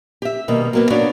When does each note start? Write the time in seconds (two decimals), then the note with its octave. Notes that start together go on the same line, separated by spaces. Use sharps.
0.22 G4 E5
0.48 B2 D#3 G3 A#3
0.73 F#3 A#3 B3
0.90 A#3 B3 D4 F#4 C#5 D5